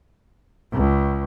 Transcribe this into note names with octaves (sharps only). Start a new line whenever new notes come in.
C#2